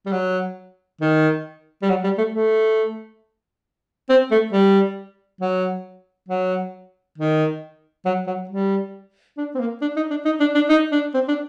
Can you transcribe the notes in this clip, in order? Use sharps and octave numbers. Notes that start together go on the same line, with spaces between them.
G3
F#3
D#3
G3
F#3
G3
A3
A3
C4
A3
G3
F#3
F#3
D#3
F#3
F#3
G3
D4
C4
A#3
D4
D#4
D4
D#4
D4
D4
D#4
D4
C4
D4